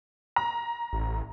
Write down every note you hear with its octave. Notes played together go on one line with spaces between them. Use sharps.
A#5
A1